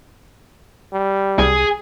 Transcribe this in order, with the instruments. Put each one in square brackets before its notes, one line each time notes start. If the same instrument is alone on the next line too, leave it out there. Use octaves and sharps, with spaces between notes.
[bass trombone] G3
[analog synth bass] C2 [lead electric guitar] G#4